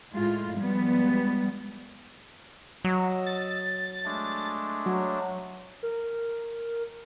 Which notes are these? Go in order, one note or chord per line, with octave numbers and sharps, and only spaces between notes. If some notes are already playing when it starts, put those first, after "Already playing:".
A2 G#3 F4
F3 G3 G#3 B3
F#3 D#5 E6
A6
G#3 A3 D4
F#3
A#4